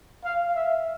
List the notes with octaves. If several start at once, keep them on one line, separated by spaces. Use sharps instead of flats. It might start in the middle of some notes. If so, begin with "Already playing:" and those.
F5
E5